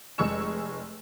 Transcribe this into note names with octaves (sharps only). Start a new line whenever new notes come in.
F1 G#3 G#4 C#6 E6 E7